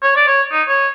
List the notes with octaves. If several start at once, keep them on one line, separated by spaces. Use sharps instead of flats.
C#5
D5
C#5
D#4
C#5